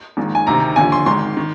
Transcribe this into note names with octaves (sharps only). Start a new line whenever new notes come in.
A#1 G#2 D#3
G#5
D2 C3 D#3 A#5
D#2 D3 F3 G#5
C6
G#1 G#2 D#3 C6
D#3